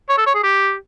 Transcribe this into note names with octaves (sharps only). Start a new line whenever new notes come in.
C#5
A4
C#5
G#4
G4